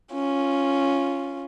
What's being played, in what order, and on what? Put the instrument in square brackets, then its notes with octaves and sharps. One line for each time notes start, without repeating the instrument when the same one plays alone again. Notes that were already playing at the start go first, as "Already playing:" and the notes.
[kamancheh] C#4 F4